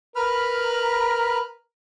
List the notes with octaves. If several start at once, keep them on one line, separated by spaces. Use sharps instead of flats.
A#4 B4 B5 F6